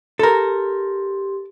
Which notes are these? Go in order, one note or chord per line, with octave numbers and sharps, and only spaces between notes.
G4 A4 A#4 C6